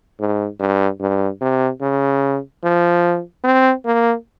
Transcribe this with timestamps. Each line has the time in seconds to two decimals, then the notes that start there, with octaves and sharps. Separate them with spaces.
0.20 G#2
0.60 G2
1.00 G2
1.41 C3
1.81 C#3
2.64 F3
3.44 C4
3.85 A#3